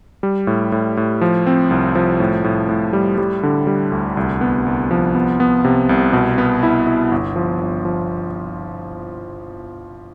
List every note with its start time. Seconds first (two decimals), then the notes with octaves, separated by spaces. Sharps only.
0.23 G3
0.47 A2
0.72 A2
0.97 A2
1.21 F3
1.47 C4
1.71 C2
1.95 F3
2.20 A2
2.44 A2
2.69 A2
2.93 G3
3.18 G3
3.43 D3
3.67 G3
3.92 D2
4.17 C2
4.41 B3
4.66 C2
4.91 F3
5.15 B3
5.40 B3
5.65 C3
5.89 C2
6.13 B2
6.38 B3
6.63 E4
6.87 E4
7.11 G1
7.36 F3
7.61 G1
7.85 F3